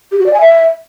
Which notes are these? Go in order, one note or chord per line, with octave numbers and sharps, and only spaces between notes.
G4
F#4
D5
G#5
E5